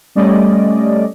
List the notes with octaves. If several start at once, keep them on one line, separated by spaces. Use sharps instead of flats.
G3 A3 C#4 D5 D#5